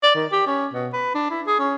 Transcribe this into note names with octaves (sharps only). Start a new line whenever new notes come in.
D5
D#3
G4
C#4
B2
B4
D4
E4
G#4
C#4